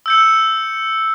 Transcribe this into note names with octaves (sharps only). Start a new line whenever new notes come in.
E6 G6 C#7